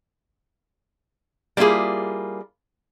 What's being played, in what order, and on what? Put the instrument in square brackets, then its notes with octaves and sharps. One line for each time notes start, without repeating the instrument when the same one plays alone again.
[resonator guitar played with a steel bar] G3 A#3 E4 F4 G#4